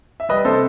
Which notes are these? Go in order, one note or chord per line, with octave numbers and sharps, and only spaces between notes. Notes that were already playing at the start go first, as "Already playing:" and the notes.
E5
G3 B4 D#5
C3 A4 C5